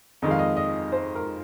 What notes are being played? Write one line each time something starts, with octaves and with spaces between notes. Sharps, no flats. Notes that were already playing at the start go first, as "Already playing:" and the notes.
F2 D#3 G#3 D#5
F5
D#5
D#5
C5
A#4